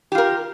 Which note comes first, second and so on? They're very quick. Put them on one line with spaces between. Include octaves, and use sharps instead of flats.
G4 F4 A#4